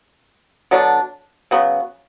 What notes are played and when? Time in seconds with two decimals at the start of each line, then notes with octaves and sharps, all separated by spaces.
0.71 D3 F#3 B3 D4
1.51 C#3 F#3 B3